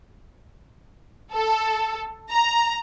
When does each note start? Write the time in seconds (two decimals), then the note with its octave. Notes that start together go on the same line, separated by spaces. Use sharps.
1.33 A4
2.31 A#5